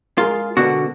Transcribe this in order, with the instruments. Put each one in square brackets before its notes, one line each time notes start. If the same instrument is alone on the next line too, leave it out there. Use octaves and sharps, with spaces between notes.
[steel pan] G#3 G#4 A#4 [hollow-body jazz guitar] F4
[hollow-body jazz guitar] B2 D3 F#4 [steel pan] B3 D4